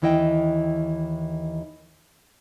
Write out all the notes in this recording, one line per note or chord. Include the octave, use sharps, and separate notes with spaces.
D#2 D#3 E3 E4 D#5 G5